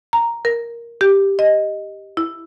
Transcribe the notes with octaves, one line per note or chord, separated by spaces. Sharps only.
A#5
A#4
G4
D#5
E4